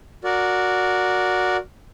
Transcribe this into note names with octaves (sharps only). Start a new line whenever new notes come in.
F#4 A#4 D5